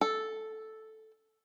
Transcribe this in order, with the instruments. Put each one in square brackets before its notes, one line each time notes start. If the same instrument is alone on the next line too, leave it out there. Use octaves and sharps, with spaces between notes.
[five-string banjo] A4